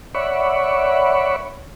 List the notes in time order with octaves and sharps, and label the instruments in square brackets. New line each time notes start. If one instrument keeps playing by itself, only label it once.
[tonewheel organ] C#5 D5 E5 F#5 B5 C#6